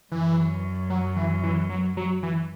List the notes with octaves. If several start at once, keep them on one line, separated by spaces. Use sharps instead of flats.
F#2 E3
F#3
E3
E3
F#3
F#3
E3